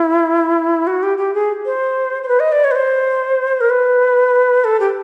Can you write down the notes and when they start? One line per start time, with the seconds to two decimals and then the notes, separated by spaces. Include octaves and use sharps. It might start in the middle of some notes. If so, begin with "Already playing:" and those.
Already playing: E4
0.87 F#4
1.03 G4
1.18 G4
1.34 G#4
1.66 C5
2.23 C5
2.28 B4
2.40 D#5
2.52 D5
2.64 C#5
2.71 B4
2.75 C5
3.61 A#4
3.70 B4
4.64 A4
4.80 G4